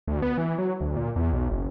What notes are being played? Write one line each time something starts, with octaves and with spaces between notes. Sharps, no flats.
D2
B3
E3
F#3
D2
A#2
E2
B1
F#1